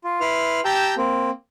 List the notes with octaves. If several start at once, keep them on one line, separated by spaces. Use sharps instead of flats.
F4
E4 B4 C6 F6
G4 G5 A5 A#5 E6 G6
A#3 C4